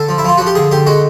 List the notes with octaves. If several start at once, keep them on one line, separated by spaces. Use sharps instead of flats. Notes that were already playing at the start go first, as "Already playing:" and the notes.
Already playing: D3 A4
F3
E4
F3 F4
F3 F#4
G4
D3 G#4
D3 G4
G#3 F#4